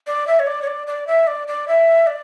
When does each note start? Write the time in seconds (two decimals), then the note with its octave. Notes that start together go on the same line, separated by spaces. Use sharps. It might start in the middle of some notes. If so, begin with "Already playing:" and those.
0.07 D5
0.27 E5
0.39 C#5
0.47 D5
0.62 C#5
0.67 D5
0.87 D5
1.07 E5
1.27 D5
1.48 D5
1.68 E5
2.07 D5